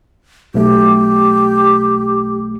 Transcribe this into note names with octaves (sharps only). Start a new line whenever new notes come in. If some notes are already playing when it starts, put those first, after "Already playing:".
B1 A3 G4